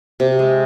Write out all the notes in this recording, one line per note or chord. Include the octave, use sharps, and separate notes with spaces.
C3
G#3